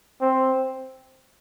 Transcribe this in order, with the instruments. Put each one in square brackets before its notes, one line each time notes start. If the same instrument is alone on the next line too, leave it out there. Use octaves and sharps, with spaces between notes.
[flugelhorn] C4